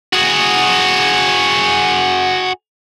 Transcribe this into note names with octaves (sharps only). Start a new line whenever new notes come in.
F#4 G#4